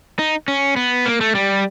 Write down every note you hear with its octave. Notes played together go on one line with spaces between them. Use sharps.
D#4
C#4
B3
A#3
A3
G3